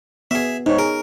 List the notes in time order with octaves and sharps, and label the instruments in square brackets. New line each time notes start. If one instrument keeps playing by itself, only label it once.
[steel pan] B3 [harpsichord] G#4 E5
[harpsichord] G#2 [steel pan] D#4 C#5
[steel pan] G#4 [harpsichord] A#4